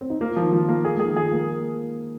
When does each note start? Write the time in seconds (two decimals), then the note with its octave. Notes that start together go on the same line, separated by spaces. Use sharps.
0.01 C4
0.10 D#4
0.20 A#3 F4
0.31 F4
0.36 D#3 F3
0.53 F3
0.69 A#3
0.84 F3 G#4
0.95 G#3
1.00 G#4
1.05 D#3
1.16 F3 G#4
1.32 A#3